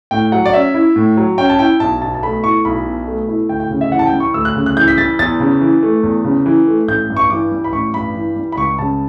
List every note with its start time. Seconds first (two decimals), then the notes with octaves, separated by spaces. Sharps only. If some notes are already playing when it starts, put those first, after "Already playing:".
0.11 A2 G5
0.32 F#3 F#5
0.46 D5
0.53 C#4 E5
0.74 E4
0.96 A2
1.17 F#3
1.38 C#4 G5
1.49 A5
1.59 E4 G5
1.80 B1 A5
2.01 B2 A5
2.14 A5
2.23 A3 B5
2.43 E4 C#6
2.65 B1 B5
2.86 B2
3.08 A3
3.28 E4
3.49 D2 G5
3.60 G5
3.71 C#3
3.81 E5
3.92 E3 F#5
3.99 A5
4.06 G5
4.13 G3
4.20 C#6
4.34 D2 E6
4.45 F#6
4.55 C#3
4.66 F#6
4.76 E3 G6
4.88 B6
4.98 G3 A6
5.19 E2 A6
5.40 C#3
5.61 E3
5.83 A3
6.03 E2
6.25 C#3
6.46 E3
6.67 A3
6.88 A1 G6
7.10 G2
7.17 C#6
7.30 E3 D6
7.52 G3
7.64 B5
7.73 A1 C#6
7.94 G2 B5
8.15 E3
8.36 G3
8.52 B5
8.58 C#2 C#6
8.79 C#3 A5